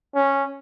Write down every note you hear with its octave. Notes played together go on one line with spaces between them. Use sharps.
C#4